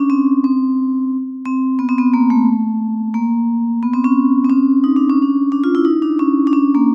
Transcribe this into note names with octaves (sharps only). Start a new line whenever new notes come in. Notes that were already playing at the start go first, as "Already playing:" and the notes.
Already playing: C#4 D4
C4
C4
C4
B3
C4
B3
A#3
A3
A#3
B3
C4
C#4
C4
C#4
D#4
D4
C#4
D4
D4
F4
E4
D#4
D4
C#4
D4
C#4
A#3